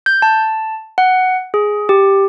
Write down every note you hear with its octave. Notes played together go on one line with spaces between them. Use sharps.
G6
A5
F#5
G#4
G4